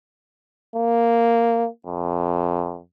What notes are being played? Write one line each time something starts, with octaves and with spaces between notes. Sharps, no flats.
A#3
F2